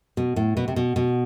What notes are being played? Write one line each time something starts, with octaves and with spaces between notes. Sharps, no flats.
B2
A2
B2
C3
B2
B2